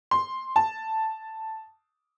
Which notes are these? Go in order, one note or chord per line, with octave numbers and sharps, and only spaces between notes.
C6
A5